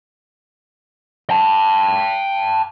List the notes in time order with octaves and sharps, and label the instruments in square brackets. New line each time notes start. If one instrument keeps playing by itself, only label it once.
[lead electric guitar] G5 A5